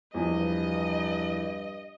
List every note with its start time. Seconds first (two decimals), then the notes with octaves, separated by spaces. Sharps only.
0.14 E2 G2 F3 D#5